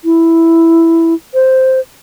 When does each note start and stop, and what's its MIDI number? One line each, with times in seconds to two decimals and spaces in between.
0.05 1.14 64
1.34 1.80 72